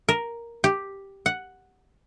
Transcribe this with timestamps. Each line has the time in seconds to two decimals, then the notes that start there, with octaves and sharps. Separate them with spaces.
0.09 A#4
0.64 G4
1.26 F#5